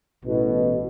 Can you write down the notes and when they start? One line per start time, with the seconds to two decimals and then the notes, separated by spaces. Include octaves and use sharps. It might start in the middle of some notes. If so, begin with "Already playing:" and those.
0.24 A1 B2